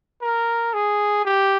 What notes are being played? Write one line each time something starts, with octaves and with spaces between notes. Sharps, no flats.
A#4
G#4
G4